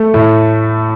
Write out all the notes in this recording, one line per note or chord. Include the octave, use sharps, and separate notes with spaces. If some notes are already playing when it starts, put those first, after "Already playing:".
Already playing: A3
A2